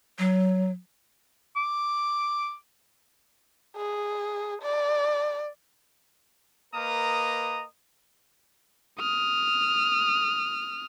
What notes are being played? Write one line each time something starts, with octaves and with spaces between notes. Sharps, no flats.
F#3
D6
G#4
D5
A#3 A#4 B4 D#5 A#5 D#6
D#6 F6